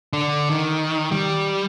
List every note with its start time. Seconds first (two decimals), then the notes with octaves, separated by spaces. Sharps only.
0.13 D3 D4
0.49 D#3
1.12 G3